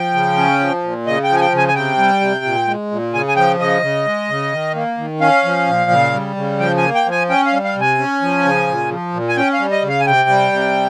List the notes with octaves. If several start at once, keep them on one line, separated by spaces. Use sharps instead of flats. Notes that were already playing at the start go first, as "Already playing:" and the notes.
Already playing: F3 G5
C#3
C#4
F3
A#2
C#3 D#5
G5
F3
G#5
G5
C#3 G#5
G#5
C3 G5
G3
C3
A#2
G#3
A#2
C#3 G#5
G#5
F3 G5
C#3 D#5
C#3
G#3
C#3
D#3
A#3
D#3
C#4 F5
F3
A#2
C#3
G3
C#3
F3 G5
G#5
A#3
G5
F3 G#5
C#4 G5
F5
G3
F5
C3
G#5
C#4
F3
C#3
A#2
F3
A#2
G#5
C#4 G5
F5
G3
D#5
C#3
F5
G#5
C3 G5
G3
C3